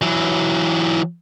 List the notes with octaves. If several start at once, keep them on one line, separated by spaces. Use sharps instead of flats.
E3 F#3